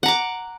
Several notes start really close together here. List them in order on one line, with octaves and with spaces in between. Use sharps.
F#5 A#5 D6